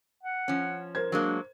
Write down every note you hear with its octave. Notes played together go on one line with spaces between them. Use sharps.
F#5
F3 C#4
A#4 C5 G#6
F#3 G#3 A#3 D4